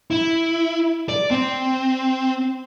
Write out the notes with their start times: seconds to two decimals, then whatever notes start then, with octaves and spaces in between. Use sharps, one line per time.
0.11 E4
1.09 D5
1.31 C4